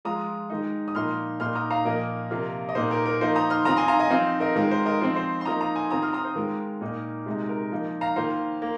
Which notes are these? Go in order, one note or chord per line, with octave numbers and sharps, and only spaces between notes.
F3 G#3 F4 A#5 D#6
D#3 G#3 D#4
D#6
A#2 F3 A#3 D#4 C6 F6
A#2 A#3 D#4 C6 F6
A#5 D#6
F5 A#5
A#2 F3 A#3 A#4 D#5
C3 F3 A#3 F4
D#5
A#2 A#3 D#4 C5
A#4
A#4
F3 A#3 D#4 C5
A#5 D#6
C6 F6
D#3 C4 F4 A#5 D#6
G#5 C6
F5 A#5
D#5 G#5
F3 C4 D#4 C5 F5
A#4 D#5
D#3 G#3 F4 A#4
C5
A#4 D#5
F3 C4 D#4 C5
C5
C6
F3 A#3 D#4 A#5 D#6
F5 A#5
G#5 C6
D#3 C4 F4 A#5 D#6
C6 F6
A#5 D#6
C5
D#3 G#3 F4 A#4
A#2 A#3 D#4
C3 G#3 D#4
A#4
F3 A#3 D#4
F5 A#5
D#3 A#3 F4 C5 F5
A#3